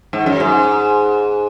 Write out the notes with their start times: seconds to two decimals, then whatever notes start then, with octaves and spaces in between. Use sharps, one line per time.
0.13 G#2
0.26 F#2
0.40 G#2